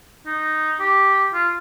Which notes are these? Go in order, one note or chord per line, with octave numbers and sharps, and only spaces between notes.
D#4
G4
F4